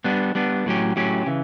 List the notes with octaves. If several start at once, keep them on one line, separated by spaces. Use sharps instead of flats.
G3 B3 D4
G3 B3 D4
A2 F#3 C#4 G4
A2 F#3 C#4 G4
C#3 E3